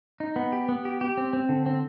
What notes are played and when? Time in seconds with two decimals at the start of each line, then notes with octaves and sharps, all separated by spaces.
0.20 D#4
0.36 B3
0.52 G4
0.69 B3
0.85 G4
1.01 G4
1.17 C4
1.33 C4
1.49 D3
1.66 C4